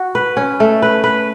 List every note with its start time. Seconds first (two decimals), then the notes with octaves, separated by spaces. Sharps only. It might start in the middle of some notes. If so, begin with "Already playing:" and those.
Already playing: F#4
0.15 B4
0.37 C#4
0.60 A3
0.82 B4
1.04 B4